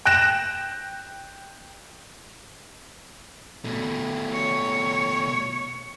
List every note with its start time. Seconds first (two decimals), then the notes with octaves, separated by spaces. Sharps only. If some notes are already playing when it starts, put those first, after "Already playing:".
0.05 G5 F#6 A#6 E7
3.65 B2 A3
4.32 C#5